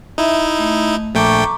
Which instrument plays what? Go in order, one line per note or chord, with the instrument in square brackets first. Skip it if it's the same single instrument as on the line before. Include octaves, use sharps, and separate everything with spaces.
[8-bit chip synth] D#4 E4 [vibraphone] E5
[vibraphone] A3
[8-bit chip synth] A#1 A3 G5 [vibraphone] A#5 C#6 D6